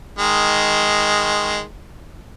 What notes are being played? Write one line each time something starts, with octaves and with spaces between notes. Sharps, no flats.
D#3 G#3